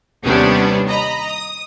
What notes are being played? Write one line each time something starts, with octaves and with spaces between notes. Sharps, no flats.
D#2 C3 G3 B3 C#4 D4
D#5 A#5 B5
D#6